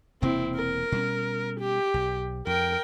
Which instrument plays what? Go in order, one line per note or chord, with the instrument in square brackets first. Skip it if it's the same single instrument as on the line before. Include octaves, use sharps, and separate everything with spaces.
[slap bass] E1 C3 A#3 [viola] C4 E4
[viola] A#4
[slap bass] B2 G3 C#4
[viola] G4
[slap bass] B1
[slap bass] F2 [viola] A#4 G5